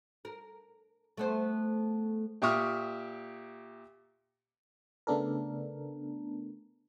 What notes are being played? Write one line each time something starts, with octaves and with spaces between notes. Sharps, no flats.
A#4
A3 B3 C5
A#2 G4 E5 C#6 D#6 F6
C#3 A3 B3 D4 A4 A#4